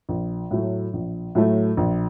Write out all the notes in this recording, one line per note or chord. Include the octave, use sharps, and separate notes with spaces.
A#1
A2 F#3 A3
A#1
A2 F#3 A3
A#1